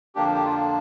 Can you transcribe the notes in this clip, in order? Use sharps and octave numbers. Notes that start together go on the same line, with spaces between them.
F2 D3 F3 A#3 D4 G4
G4
F4